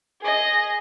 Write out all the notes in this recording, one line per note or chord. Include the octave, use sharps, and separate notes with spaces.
G#4 D#5